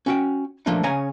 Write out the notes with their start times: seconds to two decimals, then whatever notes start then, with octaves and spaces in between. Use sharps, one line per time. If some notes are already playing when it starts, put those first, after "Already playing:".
0.06 C#4 F#4 G5
0.66 F3 A3 A#3 D4 D#4
0.83 C#3 C#4 C#5 G#5 A#5